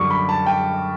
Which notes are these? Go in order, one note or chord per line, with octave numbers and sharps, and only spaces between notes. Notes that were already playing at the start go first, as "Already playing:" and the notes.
Already playing: F#2 D3 G3 C#6 D6
B5
A5
G5